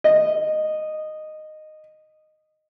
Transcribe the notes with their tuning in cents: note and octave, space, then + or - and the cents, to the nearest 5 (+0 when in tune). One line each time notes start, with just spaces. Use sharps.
D#5 -10